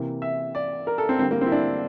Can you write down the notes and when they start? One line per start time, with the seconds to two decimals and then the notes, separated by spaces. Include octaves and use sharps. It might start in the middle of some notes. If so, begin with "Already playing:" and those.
Already playing: C3 E3 A#3
0.22 E5
0.55 D5
0.87 A#4
0.98 A4
1.09 C4
1.19 D3 G3 A#3 C4
1.31 A#3
1.41 C4
1.46 E4
1.52 D4